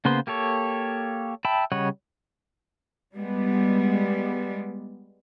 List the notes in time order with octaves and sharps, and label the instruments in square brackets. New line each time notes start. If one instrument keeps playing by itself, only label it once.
[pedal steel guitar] C#3 A#3 B3 C5 C6
A#3 G4 A4 C#5
E5 G5 A5 B5
C#3 G3 C#5 D#5 F#5
[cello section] G3 G#3 B3